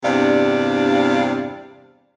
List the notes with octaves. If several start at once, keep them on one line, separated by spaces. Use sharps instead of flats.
E2 G2 C3 D4 D5 F5